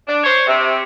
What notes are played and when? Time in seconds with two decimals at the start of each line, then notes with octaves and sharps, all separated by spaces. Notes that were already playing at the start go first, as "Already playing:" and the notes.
0.07 D4
0.24 C5 C#5
0.48 C3